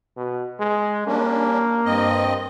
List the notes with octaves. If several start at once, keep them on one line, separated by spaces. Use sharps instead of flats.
B2
G#3
G3 A#3 C#4 D4
G2 C4 D#5